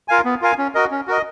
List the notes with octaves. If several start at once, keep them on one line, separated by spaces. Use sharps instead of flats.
F4 A#4 F5 G#5
B3
F4 A#4 F5 G#5
C#4
F#4 A#4 D#5
C#4
F#4 A#4 D#5